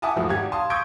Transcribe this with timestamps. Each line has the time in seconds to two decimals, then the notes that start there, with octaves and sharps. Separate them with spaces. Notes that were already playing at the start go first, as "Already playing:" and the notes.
0.02 E5 F#5 G#5 A5 D6 D#6
0.16 E1 A2 F3 F#4 D#6
0.29 G#1 G4 F#5 G#6
0.52 F5 A5 C6 D#6
0.70 C#6 D#6 E6 G6 G#6 D7